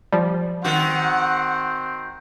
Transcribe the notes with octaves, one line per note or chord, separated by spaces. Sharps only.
F3 G3
D#3 C4 F#4 F#5